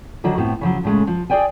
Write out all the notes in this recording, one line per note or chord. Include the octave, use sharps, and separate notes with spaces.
D3 D#3 F#3 F#4
A2 B3 C4
C#3 F3 F#3
A2 C#3 G#3 A3
F3
G#4 A4 D5 G5 G#5